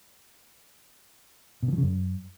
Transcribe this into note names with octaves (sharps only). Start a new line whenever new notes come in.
B2
D3
F3
C#3
F#2